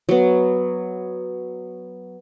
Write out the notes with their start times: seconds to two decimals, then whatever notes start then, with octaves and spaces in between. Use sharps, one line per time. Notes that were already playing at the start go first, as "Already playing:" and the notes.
0.09 F#3 B3